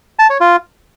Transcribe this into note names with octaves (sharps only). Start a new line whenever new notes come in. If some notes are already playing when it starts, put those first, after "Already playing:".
A5
C#5
F4